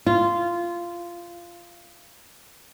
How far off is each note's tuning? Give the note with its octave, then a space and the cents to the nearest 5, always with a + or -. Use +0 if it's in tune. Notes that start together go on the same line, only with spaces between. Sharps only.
F4 -15